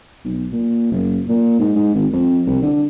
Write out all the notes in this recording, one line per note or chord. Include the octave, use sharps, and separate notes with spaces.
B1
A#2
F#1
A#2
G#2
G#2
G#1
F2
C2
D3